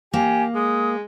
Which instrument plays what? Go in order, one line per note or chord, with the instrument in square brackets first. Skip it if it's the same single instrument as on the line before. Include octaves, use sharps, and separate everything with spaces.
[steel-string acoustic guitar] A#3 [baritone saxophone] G4 [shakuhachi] G#5
[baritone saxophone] G#3 [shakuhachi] D#6